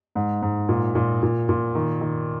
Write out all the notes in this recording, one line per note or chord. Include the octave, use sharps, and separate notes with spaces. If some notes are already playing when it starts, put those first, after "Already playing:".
G#2
G#2
A#2
A#2
A#2
A#2
D#3
D#3